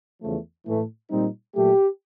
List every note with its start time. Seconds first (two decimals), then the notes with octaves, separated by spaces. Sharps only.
0.21 E2 C#3 F3 A3
0.67 A2 E3 A3
1.11 A#2 G3 C4 D#4
1.56 A#2 F#3 A3 G4